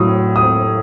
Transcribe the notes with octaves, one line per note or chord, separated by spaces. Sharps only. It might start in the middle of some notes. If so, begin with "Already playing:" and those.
Already playing: A2 F#3 D#6
D#6